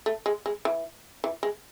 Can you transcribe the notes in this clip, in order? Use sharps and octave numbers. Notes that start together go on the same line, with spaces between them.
A3
G#3
G#3
E3
E3
G#3